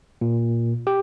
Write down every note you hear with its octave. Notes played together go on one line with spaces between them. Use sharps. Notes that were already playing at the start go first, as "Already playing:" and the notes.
A#2
G4